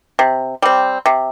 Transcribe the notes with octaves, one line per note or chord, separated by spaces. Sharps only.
C3
G3 C4
C3